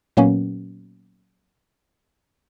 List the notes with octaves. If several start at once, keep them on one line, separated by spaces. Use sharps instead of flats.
A#2 F#3 A#3 B3 C#4 F#4